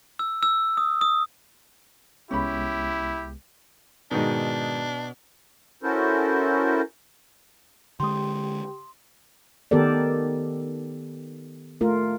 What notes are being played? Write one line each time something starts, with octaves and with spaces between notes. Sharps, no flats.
E6
E6
D#6
D#6
C2 G#3 B3 C#4 E4 G4 B5
G#2 B2 D#3 D4 D#4
C#4 E4 F#4 A4 A#4 C5
D3 G#3 G4 G5 C6 D#6
D#3 B3 G4 A4 A#4 D5
A3 F4 A#4